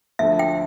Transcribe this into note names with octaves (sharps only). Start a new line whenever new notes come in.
D2 D3 F3 A3 E5
G5